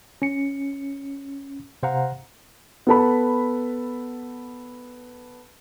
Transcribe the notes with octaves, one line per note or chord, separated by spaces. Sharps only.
C#4 C#7
C3 C5 F5 F#5 A#5
B3 A4 B5